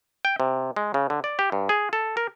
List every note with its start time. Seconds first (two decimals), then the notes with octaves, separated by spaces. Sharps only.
0.25 G5
0.40 C3
0.76 G#3
0.94 C#3
1.10 D3
1.24 D5
1.39 G4
1.52 G2
1.69 G#4
1.93 A4
2.17 A#4